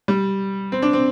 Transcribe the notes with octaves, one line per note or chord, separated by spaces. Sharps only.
G3
C4
D4
C4